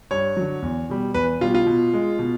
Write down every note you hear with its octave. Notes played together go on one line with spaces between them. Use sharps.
G2 C#5
D3 F#3
E2
B2 G3
E2 B4
B2 G3 F4
F4
B2
G#3
B2